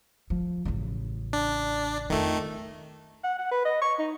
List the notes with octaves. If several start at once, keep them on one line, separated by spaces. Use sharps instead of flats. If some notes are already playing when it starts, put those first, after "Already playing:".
F3
A1 C#3
D4
F2 D#3 A3
F#5
F#5
B4
D#5
C#6
D#4